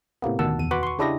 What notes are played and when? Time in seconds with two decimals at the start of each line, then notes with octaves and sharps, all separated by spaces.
0.22 A2 C3 A#3 B3
0.39 D2 B2 D#3 F#5 A5 E6
0.59 E2 D#7
0.71 F#4 B4 F#5 B5 C6 D6
0.83 C6 C#6
0.99 C#3 D4 E4 G4 D#5 A#6